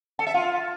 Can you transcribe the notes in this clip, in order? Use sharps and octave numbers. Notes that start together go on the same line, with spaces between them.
A4
E5
F4